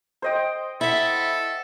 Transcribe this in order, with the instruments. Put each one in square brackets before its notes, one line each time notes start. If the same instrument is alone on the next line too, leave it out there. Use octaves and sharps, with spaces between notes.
[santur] C5 D#5 G5
[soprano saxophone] E4 [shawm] A4 [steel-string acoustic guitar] E5 F#5